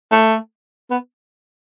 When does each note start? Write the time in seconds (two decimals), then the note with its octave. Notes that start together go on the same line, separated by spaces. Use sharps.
0.12 A3
0.91 B3